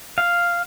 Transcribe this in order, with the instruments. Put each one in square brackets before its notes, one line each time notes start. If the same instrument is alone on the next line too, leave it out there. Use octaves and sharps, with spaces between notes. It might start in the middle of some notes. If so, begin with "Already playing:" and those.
[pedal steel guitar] F5